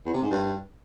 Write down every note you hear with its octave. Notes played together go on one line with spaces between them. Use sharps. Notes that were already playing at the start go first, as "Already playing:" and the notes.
E2
C3
G#2
G2